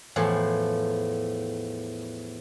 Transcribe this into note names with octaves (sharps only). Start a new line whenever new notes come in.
E2 A2 F3